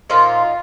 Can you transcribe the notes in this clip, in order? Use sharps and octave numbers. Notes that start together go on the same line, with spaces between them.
A#2 F3 A#3 D#4 F4